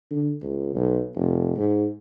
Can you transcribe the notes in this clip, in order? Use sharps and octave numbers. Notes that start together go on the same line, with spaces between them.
D3
C#2
B1
F1
G#2